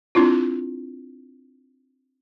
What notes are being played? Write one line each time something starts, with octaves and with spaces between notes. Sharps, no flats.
C4 D4 E4 F4